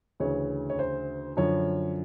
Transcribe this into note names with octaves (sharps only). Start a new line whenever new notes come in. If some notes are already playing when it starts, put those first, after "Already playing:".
D2 C#3 E3 C#5
C#5
C5
F#2 D3 F3 C#5